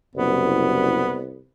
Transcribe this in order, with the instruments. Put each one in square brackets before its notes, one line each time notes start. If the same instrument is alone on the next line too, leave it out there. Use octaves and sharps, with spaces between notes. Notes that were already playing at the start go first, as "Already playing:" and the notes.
[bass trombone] F#1 [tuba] C2 [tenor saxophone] B3